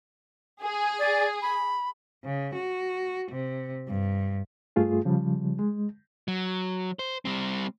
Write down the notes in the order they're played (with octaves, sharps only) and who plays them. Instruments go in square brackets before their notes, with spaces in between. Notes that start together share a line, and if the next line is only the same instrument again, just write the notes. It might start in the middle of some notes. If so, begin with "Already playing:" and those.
[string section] G#4
[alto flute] D5
B5
[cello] C#3
F#4
C3
G2
[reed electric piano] G2 A3 F4 G#4
C#3 F3 G3
G#3
[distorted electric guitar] F#3
C5
G3 C4